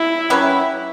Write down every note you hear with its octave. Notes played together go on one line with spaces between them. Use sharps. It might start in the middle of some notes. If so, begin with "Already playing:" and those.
Already playing: E4
F#3 C#4 G4 B4